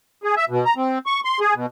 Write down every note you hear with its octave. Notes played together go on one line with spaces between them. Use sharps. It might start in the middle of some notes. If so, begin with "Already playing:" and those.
G#4
E5
B2
A#5
C4
C#6
C6
G#4
B2